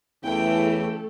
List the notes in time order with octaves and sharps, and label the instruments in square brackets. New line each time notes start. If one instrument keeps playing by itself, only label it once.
[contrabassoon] E2 [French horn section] C#3 E3 [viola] A3 A4 [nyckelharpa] G5